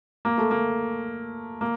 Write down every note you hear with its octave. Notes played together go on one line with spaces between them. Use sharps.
A#3
A3
A#3
A#3